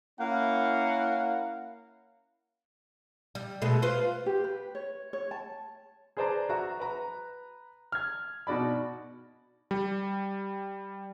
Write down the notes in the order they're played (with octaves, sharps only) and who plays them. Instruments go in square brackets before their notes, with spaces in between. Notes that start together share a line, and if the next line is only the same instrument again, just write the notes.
[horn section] A#3 C#4 E4 A#4 F5 F#5
[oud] G3
B2 G#3 A3
F4 B4 C5
[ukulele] G4
B4
C#5
C#5
A5
[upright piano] G#4 B4 C5 D5 A5 A#5
F#4 E5 A#5
B4 A#5
F6 G#6
B2 D#4 F#4 D5 B5
[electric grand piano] G3